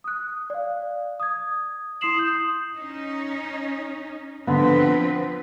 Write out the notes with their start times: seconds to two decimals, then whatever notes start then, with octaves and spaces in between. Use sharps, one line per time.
0.04 D#6 F#6
0.50 D5 F5
1.20 D#6 G#6
2.01 E4 C6 D#6 C7 E7 F#7
2.16 D#6 G6
2.75 C#4 D#4
4.47 D3 F3 B3 C4 B4